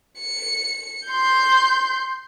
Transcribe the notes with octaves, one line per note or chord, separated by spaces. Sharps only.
C#7
C6 G6